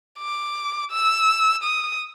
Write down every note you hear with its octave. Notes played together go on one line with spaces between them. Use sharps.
D6
E6
D#6